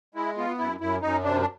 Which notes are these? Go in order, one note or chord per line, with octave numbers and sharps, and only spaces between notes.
G#3 E4
B3 F4
F#2 E4
F#2 E4
F#2 D#4
C3 D4
D4